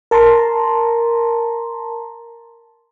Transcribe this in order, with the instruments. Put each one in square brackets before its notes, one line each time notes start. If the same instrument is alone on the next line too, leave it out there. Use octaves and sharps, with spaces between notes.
[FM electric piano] A#4 A5 A#5 C6